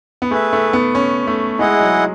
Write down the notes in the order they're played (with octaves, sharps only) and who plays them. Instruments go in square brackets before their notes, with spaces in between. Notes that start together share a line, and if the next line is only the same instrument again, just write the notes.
[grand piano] B3
[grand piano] A3 [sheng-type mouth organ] G#4 B4 E5
[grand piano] A3
B3
C#4
A3
[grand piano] G#3 [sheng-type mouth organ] E4 G#4 D#5 F#5
[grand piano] F#3